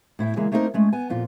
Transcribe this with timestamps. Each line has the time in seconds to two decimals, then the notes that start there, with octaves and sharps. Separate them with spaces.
0.19 A2 E4 F5 G5
0.36 C#3 E3 G#3 A#3
0.52 A3 A#3 C4 D#4 F#4 A#4
0.74 G#3 A3 C#4
0.93 B3 G#5
1.10 F2 A#2 F4